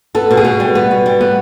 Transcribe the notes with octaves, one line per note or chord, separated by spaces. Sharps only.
B3 A4
B2
G#4
B2
G3
B3
B2
G3
B3